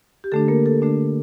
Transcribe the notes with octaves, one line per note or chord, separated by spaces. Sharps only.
G4
D3 A3 D4 A4
A#3 A#4
A4
D3 A3 D4